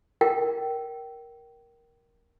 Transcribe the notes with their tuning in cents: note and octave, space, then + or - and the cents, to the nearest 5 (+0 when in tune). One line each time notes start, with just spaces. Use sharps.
A#4 +10 G5 -20